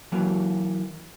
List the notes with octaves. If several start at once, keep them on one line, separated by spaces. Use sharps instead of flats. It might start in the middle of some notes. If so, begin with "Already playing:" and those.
E3 F#3 A#3